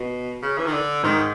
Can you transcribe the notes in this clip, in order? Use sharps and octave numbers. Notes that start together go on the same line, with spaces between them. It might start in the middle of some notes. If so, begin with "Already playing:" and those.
Already playing: B2
C#3
E3
D#3
D3
G#2 D#3